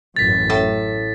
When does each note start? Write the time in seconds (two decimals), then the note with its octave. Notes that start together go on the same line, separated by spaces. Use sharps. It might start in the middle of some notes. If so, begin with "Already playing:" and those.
0.16 A1 F#2 A6 B6
0.50 A2 A5